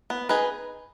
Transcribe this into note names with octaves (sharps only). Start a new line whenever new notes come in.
B3
D#4 G#4 B4